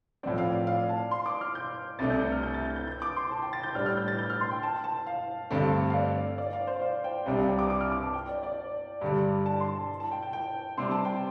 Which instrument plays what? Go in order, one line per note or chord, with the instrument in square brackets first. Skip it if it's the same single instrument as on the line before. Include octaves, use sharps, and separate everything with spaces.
[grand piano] A2 F3 C4 [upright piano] D5
[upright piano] F5
D5
F5
A5
C6
D6
F6
G6
[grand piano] C2 C3 A3 D4 [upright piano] A6
[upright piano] G6
G6
F6
G6
A6
G6
G6
G6
D6
C6
A5
G5
A6
G6
[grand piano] A2 G3 D4 [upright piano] F6
[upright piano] F6
G6
A6
G6
F6
C6
G5
A5
A5
F5
[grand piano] G2 D3 A3 C4
[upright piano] F5
D5
D5
F5
C5
F5
G5
[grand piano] C2 C3 G3 D4 [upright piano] D5
[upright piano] F5
G5
D6
D6
F6
D6
A5
G5
D5
D5
[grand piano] G2 D3 G3
[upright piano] A5
C6
A5
A5
G5
G5
G5
[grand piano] C3 G3 C4 [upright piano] C6
[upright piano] A5
G5